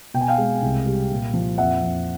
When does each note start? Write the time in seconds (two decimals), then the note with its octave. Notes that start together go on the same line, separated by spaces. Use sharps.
0.14 B2 G5
0.21 G#5
0.28 F5 G5
0.38 G#3
0.62 C2
0.86 G3
1.11 A#2
1.34 F3
1.58 F2 E5 F#5
1.82 F2